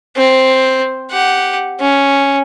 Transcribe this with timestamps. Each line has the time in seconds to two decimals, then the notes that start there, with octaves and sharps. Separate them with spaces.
0.17 C4
1.11 G4 F#5
1.80 C#4